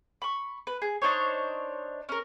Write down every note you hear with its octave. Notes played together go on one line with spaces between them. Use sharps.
B5 C#6
B4
G#4
D4 D#4 C5 C#5
C#4 A#4